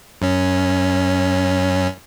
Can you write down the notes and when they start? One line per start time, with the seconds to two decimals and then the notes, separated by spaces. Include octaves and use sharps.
0.22 F#2 C#4